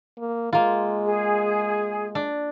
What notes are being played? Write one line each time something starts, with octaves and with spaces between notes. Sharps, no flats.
A#3
G#3 A#3 F4
G#4
D4